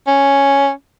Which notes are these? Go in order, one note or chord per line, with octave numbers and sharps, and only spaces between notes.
C#4